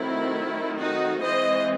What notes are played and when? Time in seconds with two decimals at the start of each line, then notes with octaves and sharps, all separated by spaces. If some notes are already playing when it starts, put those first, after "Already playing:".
Already playing: D#3 F#3 A3 C4 E4
0.79 D#4 F#4
1.22 E3 G#3 C4 C5 D#5